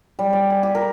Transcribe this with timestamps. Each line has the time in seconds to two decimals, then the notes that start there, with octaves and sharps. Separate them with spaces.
0.19 G3
0.33 D5
0.50 G#5
0.63 G4
0.75 A#4